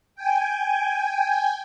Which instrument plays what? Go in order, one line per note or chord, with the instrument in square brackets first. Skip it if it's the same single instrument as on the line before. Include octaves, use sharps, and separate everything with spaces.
[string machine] G5 G#5